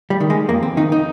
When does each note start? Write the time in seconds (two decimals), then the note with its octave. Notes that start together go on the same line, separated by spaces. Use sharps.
0.10 G3
0.20 D#3
0.30 G#3
0.49 F2 A#3
0.63 C4
0.77 D#3 D#4
0.92 D#4